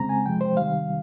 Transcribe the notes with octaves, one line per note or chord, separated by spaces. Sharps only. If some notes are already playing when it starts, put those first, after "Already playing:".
Already playing: C#3 G#3 C4 A#5
G#5
C3 F3 G#3 G5
C5
C3 D#3 G3 F5